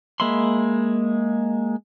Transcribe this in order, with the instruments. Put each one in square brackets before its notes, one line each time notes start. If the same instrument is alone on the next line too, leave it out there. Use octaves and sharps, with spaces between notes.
[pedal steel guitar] G#3 A#3 E5 B5 C6